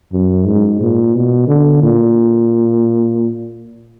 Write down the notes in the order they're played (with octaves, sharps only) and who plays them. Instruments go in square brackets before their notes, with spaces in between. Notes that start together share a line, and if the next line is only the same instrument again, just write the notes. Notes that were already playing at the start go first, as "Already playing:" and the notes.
[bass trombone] F#2
G#2
A#2
B2
D3
A#2